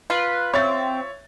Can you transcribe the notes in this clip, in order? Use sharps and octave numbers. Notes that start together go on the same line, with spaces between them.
F4 B4
C4 C#5 E5 A6